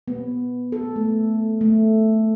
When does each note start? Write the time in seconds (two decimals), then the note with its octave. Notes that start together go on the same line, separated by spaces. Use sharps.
0.08 B3
0.72 A4
0.96 A3
1.61 A3